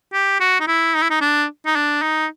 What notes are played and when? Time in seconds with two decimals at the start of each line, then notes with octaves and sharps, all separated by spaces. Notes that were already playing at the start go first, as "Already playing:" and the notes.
0.13 G4
0.40 F#4
0.60 D#4
0.67 E4
0.95 D#4
1.02 E4
1.10 D#4
1.21 D4
1.66 D#4
1.76 D4
2.02 D#4